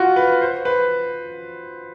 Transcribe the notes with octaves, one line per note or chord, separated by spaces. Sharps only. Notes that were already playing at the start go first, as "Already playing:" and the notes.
Already playing: F4 F#4
B4
C5
B4